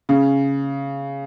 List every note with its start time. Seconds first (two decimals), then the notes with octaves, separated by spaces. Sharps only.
0.09 C#3